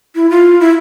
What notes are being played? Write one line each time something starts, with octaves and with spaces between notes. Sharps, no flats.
E4
F4
E4